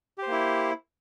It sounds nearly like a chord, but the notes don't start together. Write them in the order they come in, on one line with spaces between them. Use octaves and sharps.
G4 C5 A#3 E4